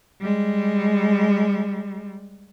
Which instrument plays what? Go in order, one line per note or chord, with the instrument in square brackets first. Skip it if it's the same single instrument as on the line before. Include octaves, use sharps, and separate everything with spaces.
[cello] G3 G#3